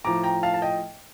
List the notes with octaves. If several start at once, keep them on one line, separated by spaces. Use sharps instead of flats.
A2 F3 A3 A#5 D6
G5 A#5
F5 A5
A5
D#5 G5